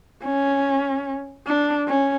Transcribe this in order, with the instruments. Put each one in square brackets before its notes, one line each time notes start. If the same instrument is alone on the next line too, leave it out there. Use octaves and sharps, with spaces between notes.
[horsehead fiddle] C#4
D4
C#4